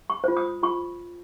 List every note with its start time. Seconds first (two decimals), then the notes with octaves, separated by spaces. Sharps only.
0.10 C#6
0.24 F4 C5
0.37 D#6
0.63 F4 C#6